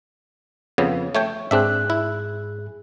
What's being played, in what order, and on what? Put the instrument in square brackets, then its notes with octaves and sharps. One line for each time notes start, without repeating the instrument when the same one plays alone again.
[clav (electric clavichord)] F2 C#3 B3
A3 C#5 G5
[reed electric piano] G#2 G#4 F#6 [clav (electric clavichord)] C4 D4 E5
[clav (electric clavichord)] E4